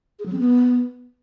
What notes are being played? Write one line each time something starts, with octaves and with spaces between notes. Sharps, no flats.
G#4
F#3
C4
B3